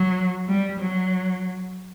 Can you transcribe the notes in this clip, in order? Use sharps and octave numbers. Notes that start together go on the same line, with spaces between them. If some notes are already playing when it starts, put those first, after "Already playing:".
Already playing: F#3
G3
F#3